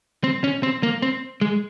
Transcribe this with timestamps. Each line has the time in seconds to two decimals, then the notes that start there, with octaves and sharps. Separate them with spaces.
0.24 C4
0.44 C#4
0.63 C4
0.83 A#3
1.02 C4
1.41 G#3